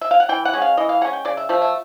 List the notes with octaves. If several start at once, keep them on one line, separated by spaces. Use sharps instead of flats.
E5
F5
F#5
E3 G5
F#5
G#3 C#4
F5
E3 D#5
F5
G#3 C#4 F#5
G5
C#3 D5
E5
F3 A3 E5
E5